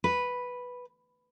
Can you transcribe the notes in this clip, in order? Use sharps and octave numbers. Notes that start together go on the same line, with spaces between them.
B4